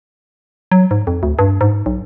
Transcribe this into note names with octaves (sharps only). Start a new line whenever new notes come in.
F#3
G#2
F2
D2
G2
G#2
B1